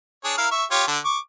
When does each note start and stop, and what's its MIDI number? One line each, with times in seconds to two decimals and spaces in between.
0.24 0.37 62
0.24 0.37 68
0.24 0.37 73
0.38 0.47 64
0.38 0.47 70
0.38 0.47 77
0.51 0.64 76
0.51 0.64 85
0.71 0.83 65
0.71 0.83 67
0.71 0.83 73
0.87 0.98 50
0.87 0.98 62
1.05 1.18 85
1.05 1.18 86